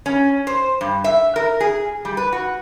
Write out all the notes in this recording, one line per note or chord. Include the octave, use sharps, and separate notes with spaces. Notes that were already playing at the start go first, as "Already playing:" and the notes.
C#4
C5
G2
E5
A#4
G#4
G3
B4
F#4